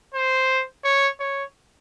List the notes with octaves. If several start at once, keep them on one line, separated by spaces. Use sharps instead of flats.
C5
C#5
C#5